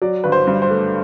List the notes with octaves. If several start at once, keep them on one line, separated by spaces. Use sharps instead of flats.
F#3 D5
G1 B4
C5
G2
C5
A3